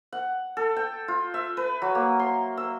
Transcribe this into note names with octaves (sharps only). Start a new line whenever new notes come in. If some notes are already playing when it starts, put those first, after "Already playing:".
F#5
A4
G5
F4
E5
B4
F#3
A#3
C6
E6